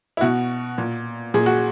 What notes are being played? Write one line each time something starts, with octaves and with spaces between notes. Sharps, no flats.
E4
B2 F#4
A#2
A#2 G#4
F#4